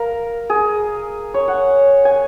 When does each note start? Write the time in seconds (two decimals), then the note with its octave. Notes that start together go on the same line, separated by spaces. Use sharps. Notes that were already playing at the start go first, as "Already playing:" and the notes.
Already playing: A#4 F5
0.50 G#4
1.34 C#5
1.48 F#5
2.05 G#5